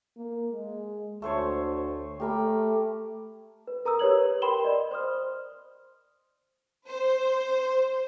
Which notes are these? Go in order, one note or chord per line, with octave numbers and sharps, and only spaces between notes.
A#3
G#3
D2 A3 C5 C#5
A3 G4 A#4 B5
B4
A#4 A#5 D#6 E6
G4 B4 C#5 G#6 F#7
A#4 G5 B5 C6 E7 G7
D5 D#5
C5 C6 D#6 F6
C5